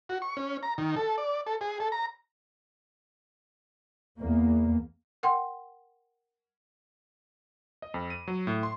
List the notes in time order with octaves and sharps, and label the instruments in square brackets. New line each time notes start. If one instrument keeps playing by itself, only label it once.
[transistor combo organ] F#4
C#6
C#4
A#5
D#3
A4
D5
A4
G#4
A4
A#5
[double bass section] E2 A#3
[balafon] A#4 F#5 G5 C6
[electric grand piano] D#5
F2
D#7
F#3
A2
C6